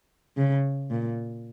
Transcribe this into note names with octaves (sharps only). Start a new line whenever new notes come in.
C#3
A#2